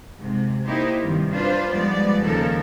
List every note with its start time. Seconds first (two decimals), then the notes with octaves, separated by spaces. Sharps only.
0.18 G#2 C3
0.66 A#3 D#4 E4 G4 C5
1.01 G2 C3 D#3 F3
1.32 D4 F4 B4 C5
1.72 G#2 F3 G3 G#3 B3 D5
2.23 D#2 C#3 F3 A4 A#4